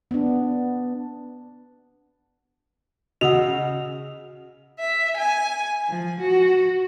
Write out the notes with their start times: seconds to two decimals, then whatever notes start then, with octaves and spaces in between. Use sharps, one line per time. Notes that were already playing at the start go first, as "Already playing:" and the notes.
0.11 B3 D4
3.21 C#3 F#4 D#5 F#5 D#6 E6 F7
4.79 E5
5.16 G#5
5.88 F3
6.19 F#4